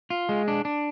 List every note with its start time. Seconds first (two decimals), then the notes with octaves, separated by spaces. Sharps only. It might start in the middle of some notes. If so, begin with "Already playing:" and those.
0.10 F4
0.29 G#3
0.48 D4
0.65 D4